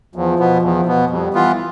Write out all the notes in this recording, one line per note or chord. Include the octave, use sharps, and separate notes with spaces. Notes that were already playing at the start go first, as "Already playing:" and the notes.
E2 F3
B2 B3
E2
B2 B3
F2 G3
E3 B3 F4